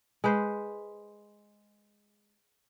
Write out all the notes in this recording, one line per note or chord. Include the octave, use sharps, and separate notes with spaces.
G#3 B4 C5